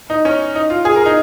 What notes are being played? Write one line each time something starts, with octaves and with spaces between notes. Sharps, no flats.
D#4
C#4
D#4
F4
G#4
A#4
D#4